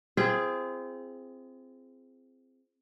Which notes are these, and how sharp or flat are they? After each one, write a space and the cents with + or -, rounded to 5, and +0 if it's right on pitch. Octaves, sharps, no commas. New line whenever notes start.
C4 +0 F4 -35 G#4 +0